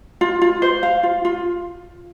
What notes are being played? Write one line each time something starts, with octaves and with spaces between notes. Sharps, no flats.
F4
F4
C5
F5
F4
F4